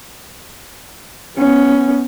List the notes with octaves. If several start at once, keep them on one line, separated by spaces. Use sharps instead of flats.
B3 C#4